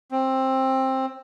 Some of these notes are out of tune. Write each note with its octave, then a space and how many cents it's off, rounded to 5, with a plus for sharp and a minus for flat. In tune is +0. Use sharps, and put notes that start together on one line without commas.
C4 +15